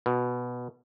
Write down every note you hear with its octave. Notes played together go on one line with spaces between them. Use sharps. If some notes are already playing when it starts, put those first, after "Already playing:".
B2